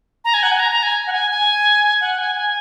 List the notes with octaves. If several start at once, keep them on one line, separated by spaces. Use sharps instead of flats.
A#5
G#5
F#5
G#5
A#5
A#5
G#5
F#5
G#5
G#5
F#5
G#5
G#5